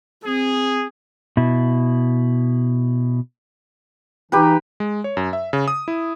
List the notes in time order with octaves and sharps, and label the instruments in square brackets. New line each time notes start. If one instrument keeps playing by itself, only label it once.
[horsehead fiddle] C4 [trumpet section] G#4
[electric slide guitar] B2 E4
[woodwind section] E3 D#4 [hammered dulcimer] G4 B4
[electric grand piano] G#3
C#5
F#2
E5
C#3
D#6
E4